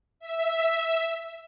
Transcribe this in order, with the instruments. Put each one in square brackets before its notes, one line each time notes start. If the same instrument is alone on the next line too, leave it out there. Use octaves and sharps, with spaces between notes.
[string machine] E5